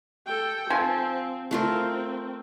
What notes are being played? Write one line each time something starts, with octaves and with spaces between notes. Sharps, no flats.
A4 G5
F3 C4 A4 G#5
A3 C4 F4 A#4